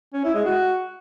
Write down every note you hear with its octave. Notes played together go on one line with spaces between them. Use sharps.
C#4
E4
G#3
F#4